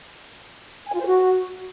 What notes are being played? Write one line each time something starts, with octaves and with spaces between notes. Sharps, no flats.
G#5
F4
C5
F#4